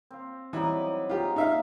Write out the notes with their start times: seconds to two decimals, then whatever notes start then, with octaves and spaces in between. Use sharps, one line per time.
0.11 C4 F5
0.53 E3 F#3 G3 D#4
1.09 D#3 G#3 F4 G4
1.36 A#2 D#4 F#4 E5 F5